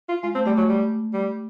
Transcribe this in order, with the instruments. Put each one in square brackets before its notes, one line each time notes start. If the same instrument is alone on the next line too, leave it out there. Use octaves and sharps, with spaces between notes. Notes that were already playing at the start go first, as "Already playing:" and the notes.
[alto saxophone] F4
[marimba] G#3 [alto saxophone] F4
[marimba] A3 [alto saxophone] C4
[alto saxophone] G3 [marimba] A3
[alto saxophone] F#3 [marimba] G#3
[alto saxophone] G3
G3